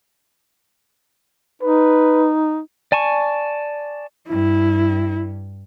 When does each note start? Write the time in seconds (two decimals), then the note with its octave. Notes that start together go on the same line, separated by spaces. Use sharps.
1.62 D#4 B4
2.92 D5 G#5 A5 C#6
4.29 G2 E4